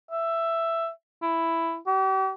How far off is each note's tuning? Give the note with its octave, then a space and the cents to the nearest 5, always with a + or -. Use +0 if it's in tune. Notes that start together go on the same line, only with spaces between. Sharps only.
E5 +10
E4 +5
G4 -40